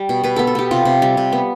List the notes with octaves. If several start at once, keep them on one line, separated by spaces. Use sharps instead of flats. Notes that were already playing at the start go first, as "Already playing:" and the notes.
Already playing: G3
B2
B2 B4
B3 A4
A4
B3 G4
C3 F4
C3
G3
C3
B3